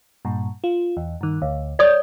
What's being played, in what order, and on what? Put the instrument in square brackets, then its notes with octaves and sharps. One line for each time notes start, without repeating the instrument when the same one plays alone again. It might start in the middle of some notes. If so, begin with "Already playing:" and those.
[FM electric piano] G2 A#2
F4
E2
G2 D#3
D2
[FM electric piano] C#5 G6 [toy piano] D5 D#6